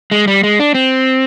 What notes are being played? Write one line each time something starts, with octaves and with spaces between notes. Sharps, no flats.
G#3
G3
G#3
D4
C4